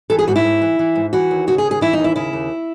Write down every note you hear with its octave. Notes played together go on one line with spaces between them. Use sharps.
E3 A4
G#4
G#2 F#4
E4
G#2
E3
E3
G#2
E3 F#4
D#2
C#3 F#4
G#4
D#2
G#4
E3 E4
D#4
D#2 E4
C#3 E4
D#2